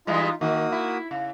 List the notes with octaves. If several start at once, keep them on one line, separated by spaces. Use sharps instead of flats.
E3 G3 G#3 D#4 F4
D#3 A#3 F#4 D#6
E4
C#3